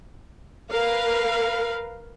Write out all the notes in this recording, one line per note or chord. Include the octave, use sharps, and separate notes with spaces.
A#4 B4 F5